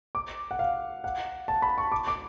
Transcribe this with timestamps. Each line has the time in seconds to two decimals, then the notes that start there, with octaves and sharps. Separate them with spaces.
0.15 D6
0.51 F#5
0.59 F5
1.04 F#5
1.48 A5
1.62 B5
1.78 C#6
1.92 D6
2.08 D6